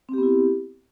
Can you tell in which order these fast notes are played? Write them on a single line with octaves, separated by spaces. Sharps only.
C4 G4 B3 E4